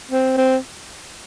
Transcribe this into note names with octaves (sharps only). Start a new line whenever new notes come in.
C4
C4